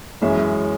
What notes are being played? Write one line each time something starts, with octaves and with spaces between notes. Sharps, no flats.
F#2 E3 G#3 C#4 E5